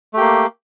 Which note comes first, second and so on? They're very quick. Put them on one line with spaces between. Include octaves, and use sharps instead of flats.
A3 G4 A#3